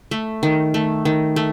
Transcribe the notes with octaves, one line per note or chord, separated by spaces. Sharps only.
A3
D#3
A3
D#3
A3